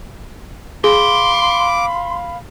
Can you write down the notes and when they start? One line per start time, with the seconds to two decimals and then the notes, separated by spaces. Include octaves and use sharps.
0.84 G#4 F5 B5 C6 D6